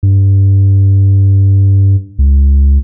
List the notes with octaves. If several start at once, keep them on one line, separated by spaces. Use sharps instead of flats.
G2
C#2